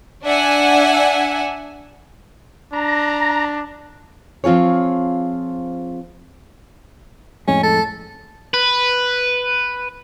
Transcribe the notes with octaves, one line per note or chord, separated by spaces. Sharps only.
D4 E5 F#5 G#5
D4 A#5
F3 C4 F4 G#4 C#5
F2 A2 G#3 C#4
A4
B4